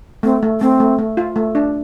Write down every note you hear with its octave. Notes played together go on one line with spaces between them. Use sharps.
A3 C4
A3
A3 C4
A3
A3
F4
A3
D4